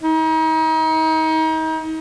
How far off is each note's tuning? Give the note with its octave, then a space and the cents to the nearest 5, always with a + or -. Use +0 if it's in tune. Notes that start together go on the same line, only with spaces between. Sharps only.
D#4 +35